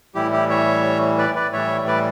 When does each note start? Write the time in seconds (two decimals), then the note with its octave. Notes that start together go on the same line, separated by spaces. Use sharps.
0.15 A2 E3 G3 E4 G4
0.32 E4 G4
0.49 C#5 E5
1.18 B4 D5
1.35 B4 D5
1.53 A2 E3 G3 C#5 E5
1.87 B4 D5